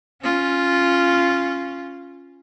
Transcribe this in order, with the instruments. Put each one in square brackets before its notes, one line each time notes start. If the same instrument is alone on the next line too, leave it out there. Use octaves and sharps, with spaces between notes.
[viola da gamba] C#4 F4